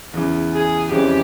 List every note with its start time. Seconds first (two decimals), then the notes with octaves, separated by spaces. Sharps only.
0.14 E2 C#3 E3
0.53 G#4
0.91 F2 C#3 E3 G#3 C#4 G4